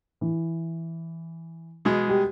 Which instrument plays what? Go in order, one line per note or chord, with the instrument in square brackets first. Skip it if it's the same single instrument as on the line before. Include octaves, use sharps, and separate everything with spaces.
[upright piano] E3
[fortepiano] B2 G#3
[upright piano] G3 G4